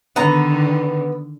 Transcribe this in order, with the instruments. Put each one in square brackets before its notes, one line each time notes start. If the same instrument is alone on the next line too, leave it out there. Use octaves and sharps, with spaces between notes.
[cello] D3 D#3 [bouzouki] B3 A#5